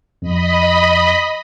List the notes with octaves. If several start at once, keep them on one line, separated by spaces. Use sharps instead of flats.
F2 D#5 B5